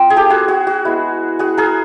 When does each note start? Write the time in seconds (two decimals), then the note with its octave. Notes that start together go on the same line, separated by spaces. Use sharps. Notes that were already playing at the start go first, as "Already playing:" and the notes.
Already playing: C4 F4
0.10 G#4
0.16 G4 A4
0.30 F#4 G#4
0.48 F#4
0.67 F#4
0.85 G#3 B3 E4
1.39 F#4 G#4
1.58 G#4 A#4